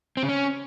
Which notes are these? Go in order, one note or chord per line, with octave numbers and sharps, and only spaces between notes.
C4
C#3
C#4